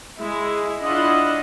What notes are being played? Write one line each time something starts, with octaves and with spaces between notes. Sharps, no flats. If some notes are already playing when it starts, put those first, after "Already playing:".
G#3 E4
D4 E4 F4 D#5 F#5